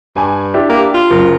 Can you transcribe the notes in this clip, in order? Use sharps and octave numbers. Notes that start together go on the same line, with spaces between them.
G2 G#5
D4 E4 G4
A#3
F4
F#1 F#2